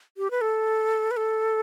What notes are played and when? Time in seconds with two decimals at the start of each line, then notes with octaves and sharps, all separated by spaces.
0.17 G4
0.31 B4
0.41 A4
1.11 B4
1.17 A4